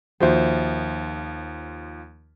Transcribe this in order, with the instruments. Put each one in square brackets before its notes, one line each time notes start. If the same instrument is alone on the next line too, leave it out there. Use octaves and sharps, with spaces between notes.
[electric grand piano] D#2 F3 [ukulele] F#4 C5 E5